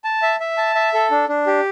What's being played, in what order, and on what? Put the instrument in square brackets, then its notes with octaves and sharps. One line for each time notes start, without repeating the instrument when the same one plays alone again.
[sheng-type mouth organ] A5
E5
E5
A5
E5
A4
D4
D4
G4